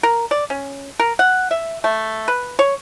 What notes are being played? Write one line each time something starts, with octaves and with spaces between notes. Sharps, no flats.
A#4
D5
C#4
A#4
F#5
E5
A3
B4
C#5